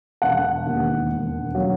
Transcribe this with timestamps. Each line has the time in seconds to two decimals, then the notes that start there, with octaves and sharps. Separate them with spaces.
0.22 E1 F#5
0.67 D#2
1.11 E1
1.55 F#3